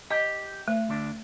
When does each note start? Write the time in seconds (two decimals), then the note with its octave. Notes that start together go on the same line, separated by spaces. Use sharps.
0.10 G4 D#5
0.68 A3
0.89 D2 D4